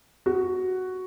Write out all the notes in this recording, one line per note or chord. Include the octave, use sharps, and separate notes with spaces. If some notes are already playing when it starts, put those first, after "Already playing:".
F#4